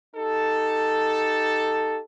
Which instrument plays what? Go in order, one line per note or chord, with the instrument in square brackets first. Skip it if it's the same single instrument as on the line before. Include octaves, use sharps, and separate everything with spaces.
[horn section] D#4 G4 A4